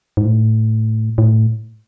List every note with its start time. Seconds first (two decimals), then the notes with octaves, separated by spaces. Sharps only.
0.17 G#2
0.25 A2
1.18 A2